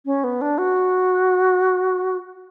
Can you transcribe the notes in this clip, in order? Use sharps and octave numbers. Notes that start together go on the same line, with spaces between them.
C#4
B3
D4
F#4